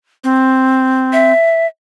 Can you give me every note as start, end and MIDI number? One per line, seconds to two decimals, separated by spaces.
0.24 1.32 60
1.13 1.67 76